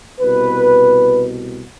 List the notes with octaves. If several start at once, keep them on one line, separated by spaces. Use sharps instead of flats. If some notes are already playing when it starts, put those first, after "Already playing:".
C2 B2 B4